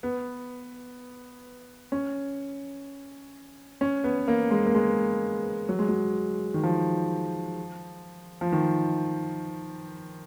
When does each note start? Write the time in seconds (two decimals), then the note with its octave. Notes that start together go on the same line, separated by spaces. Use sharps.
0.03 B3
1.92 C#4
3.81 C#4
4.04 B3
4.28 A#3
4.51 G#3
4.66 A#3
4.75 G#3
5.69 F#3
5.79 G#3
5.88 F#3
6.54 D#3
6.63 F3
8.41 F3
8.52 D#3